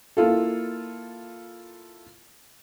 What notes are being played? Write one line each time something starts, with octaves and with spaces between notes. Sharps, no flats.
A#3 E4 F4 A4